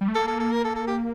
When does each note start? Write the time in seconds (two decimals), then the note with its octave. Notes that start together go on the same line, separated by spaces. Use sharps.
0.01 G3
0.08 A3
0.15 A#3 A4
0.28 A4
0.40 A4
0.52 A#4
0.65 A4
0.76 A4
0.88 G4